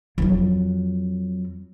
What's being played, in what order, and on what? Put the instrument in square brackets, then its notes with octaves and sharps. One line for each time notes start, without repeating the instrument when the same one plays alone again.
[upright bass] F2 F#3